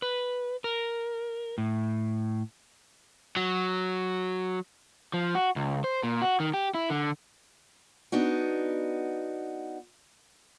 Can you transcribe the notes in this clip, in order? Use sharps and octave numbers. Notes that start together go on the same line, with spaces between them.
B4
A#4
A2
F#3
F3
F#4
C#2
C5
A#2
F#4
D#3
G4
E4
D3
B3 D4 D#4 F#4